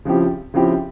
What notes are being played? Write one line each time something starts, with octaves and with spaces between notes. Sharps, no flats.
C#3 F3 C4 E4 G4
C#3 F3 C4 E4 G4